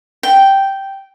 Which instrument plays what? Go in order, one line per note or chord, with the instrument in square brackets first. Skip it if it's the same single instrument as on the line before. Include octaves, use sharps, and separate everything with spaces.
[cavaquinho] G5